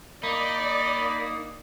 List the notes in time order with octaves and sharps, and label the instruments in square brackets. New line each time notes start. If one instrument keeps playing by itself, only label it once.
[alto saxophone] A#3 [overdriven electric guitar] D#4 [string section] D5 [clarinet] B5